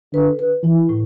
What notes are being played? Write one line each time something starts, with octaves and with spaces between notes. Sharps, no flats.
D3 B4
B4
E3 E4
A2